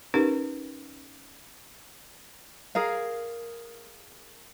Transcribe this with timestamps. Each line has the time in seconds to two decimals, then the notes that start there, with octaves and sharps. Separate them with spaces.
0.14 C#4 D#4 G4 A#4 B4
2.75 G#4 A#4 F5